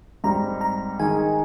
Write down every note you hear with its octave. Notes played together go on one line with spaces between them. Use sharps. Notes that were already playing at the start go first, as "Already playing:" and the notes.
G#2 G3 C4 A#5
A#5
D#3 G#3 D#4 G#5